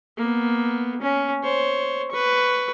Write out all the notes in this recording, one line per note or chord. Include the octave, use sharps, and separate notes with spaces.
A#3 B3
C#4
C5 C#5
B4 C#6